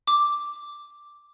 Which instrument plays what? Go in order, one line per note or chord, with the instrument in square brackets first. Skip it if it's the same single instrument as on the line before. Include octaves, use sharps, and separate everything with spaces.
[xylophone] D6